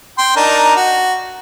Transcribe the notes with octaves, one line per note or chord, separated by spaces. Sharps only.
G5 C6
D4 D#4 A#4
F#4